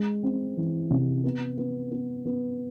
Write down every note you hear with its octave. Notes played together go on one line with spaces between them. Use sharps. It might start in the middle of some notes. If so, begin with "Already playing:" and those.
Already playing: G#3
C4
E3
C3
B3
B3
B3
B3